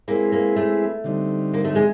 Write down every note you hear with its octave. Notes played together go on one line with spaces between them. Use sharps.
G#3 A#3 C4 E4 G#4 B4
A#3
A3
D3 G3 C4 D#4
A#3
A3
G#3